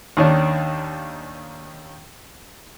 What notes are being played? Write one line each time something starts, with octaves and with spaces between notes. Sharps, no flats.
D#2 D#3 C#4 D4